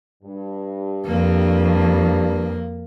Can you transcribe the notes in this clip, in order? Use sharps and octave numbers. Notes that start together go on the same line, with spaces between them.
G2
F2 A#3